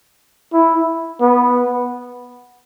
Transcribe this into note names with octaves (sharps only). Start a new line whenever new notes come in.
E4
B3